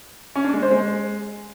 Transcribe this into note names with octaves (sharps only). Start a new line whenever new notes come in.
C#4
D4
G#3
C5
G#3